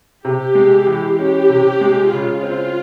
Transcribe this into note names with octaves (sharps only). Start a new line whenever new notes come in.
C3 G4
G#3
E3
C#4 G4
C3
G#3
C#3 F4
C4